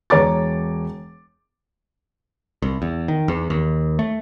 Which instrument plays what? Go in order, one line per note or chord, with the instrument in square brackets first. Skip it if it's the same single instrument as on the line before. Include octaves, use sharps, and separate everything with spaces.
[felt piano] E1 C#5 A#5 D6 A6
[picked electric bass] C2
E2
D#3
E2
D#2
A3